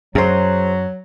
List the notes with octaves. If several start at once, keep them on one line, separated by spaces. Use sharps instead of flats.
F#2 F#3 G#4 C5